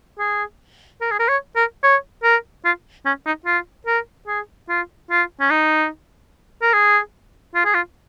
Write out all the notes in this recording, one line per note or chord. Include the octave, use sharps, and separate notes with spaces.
G#4
A#4
G#4
A#4
C#5
A#4
C#5
A#4
F4
C#4
D#4
F4
A#4
G#4
F4
F4
C#4
D#4
A#4
G#4
F4
G#4
F4